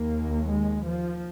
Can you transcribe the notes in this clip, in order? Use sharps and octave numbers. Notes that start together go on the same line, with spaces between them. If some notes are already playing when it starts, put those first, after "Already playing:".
Already playing: D#2 A#3
G#3
F3